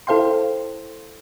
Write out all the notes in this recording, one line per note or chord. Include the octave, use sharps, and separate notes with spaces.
E4 A4 C5 F5 G5 C6